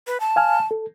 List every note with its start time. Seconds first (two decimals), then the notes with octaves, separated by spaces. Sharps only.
0.07 B4
0.20 A5
0.36 F5 G#5 F6
0.71 A4